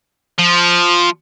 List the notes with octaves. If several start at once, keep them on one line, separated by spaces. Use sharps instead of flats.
F3